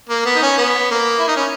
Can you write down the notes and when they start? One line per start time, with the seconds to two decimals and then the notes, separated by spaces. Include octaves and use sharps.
0.09 A#3
0.25 B3
0.36 D#4
0.42 C#4
0.58 B3
0.91 A#3
1.19 E4
1.27 D#4
1.36 C#4